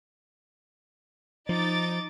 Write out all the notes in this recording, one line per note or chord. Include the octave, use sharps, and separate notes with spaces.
F3 D#4 D6 A6